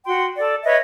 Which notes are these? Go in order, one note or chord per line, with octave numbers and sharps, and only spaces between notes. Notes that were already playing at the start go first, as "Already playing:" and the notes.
F#4 G5 C6
A4 D5
B4 C#5 D#5 E5